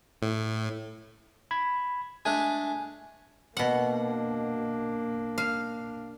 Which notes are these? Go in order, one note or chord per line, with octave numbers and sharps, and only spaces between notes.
A2
B5 G#6
G#3 A3 D4 G#5
B2 A#3 D4 F#5
F5